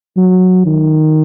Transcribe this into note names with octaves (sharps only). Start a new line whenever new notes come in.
F#3
D#3